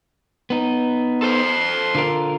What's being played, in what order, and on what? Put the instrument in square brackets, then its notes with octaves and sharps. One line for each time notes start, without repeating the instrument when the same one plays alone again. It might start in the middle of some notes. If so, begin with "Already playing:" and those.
[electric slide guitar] B3 D#4
[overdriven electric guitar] A4 C5 [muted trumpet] C6
[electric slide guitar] D3 F4 A#4